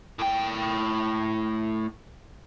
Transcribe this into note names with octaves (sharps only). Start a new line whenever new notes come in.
A2 G5